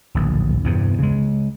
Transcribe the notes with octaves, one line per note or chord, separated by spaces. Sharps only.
D1 A#1 D#2
E2 G2 C3
C#3 G#3